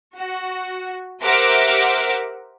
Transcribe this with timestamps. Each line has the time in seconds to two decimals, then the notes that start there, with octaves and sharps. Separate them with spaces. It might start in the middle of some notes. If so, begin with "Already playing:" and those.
0.16 F#4
1.22 G4 A#4 C5 E5 F#5 D6